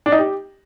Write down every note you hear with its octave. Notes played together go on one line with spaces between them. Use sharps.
D4
D#4
G4